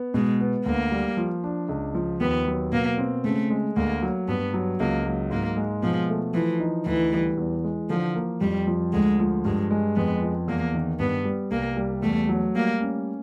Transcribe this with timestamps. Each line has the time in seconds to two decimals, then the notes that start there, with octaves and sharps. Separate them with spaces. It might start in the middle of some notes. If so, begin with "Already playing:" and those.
Already playing: B3
0.14 B2 G#3
0.40 B3
0.66 D2 A#3
0.92 G3
1.17 F3
1.44 D4
1.69 C#2
1.95 F3
2.20 D#2 B3
2.47 F#3
2.72 B2 A#3
2.98 C4
3.24 C#3 A3
3.50 G#3
3.76 D2 A#3
4.02 F#3
4.28 G2 B3
4.54 F#3
4.80 C#2 A#3
5.06 F#3
5.30 G#2 A#3
5.57 G#3
5.83 B2 F3
6.09 A3
6.34 E3 F3
6.60 D#4
6.86 D2 E3
7.12 G3
7.38 E2
7.64 G#3
7.90 D3 F3
8.15 A#3
8.41 F2 G3
8.67 F3
8.92 D2 G#3
9.19 F3
9.45 G2 G#3
9.71 G#3
9.96 F2 B3
10.22 F3
10.48 E2 A#3
10.74 D#3
10.99 G2 B3
11.25 G3
11.51 C2 A#3
11.77 G3
12.03 E2 A3
12.29 F#3
12.55 G3 A#3
12.80 C#4